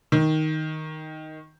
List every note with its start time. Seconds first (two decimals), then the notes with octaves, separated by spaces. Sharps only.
0.12 D#3